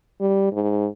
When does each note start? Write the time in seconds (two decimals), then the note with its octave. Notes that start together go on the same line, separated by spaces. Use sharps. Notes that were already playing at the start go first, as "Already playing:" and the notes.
0.20 G3
0.53 G#2